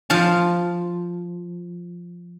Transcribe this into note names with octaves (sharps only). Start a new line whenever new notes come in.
F3 F5 A5